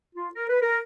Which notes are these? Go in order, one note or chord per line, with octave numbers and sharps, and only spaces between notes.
F4
A#4
B4
A#4